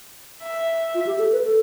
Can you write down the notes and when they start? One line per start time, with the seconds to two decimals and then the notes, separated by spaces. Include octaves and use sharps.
0.43 E5
0.95 F4
1.06 G4
1.19 A4
1.32 B4
1.44 A4